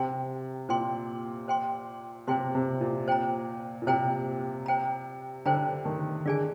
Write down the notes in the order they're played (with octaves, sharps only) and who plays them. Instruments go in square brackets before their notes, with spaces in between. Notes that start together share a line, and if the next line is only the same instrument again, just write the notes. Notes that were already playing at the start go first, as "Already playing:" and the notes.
Already playing: [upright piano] C3 [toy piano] C5 G5 C6
[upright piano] A#2 [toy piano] C5 G5 C6
[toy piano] C5 G5 C6
[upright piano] C3 [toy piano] C5 G5 C6
[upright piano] C3
A#2
[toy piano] C5 G5 A#5
[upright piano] A#2
[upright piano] C3 [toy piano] C5 G5 A#5
[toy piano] C5 G5 A#5
[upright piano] D3 [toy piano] C5 G5 A#5
[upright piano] D#3
[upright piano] D3 [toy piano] F4 G#4 D5 G#5